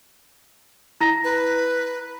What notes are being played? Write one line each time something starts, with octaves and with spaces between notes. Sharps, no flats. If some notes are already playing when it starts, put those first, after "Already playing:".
E4 A#5 A#6
B4